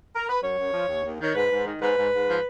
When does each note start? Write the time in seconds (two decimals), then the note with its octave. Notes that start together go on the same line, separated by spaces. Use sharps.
0.16 A#4
0.29 B4
0.42 F#2 C#5
0.58 F#2
0.73 F3
0.89 D#2
1.04 D#2
1.20 D#3 C#5
1.35 G#2 B4
1.51 G#2
1.66 D#3
1.82 G#2 B4
1.97 G#2
2.13 G#2
2.28 F3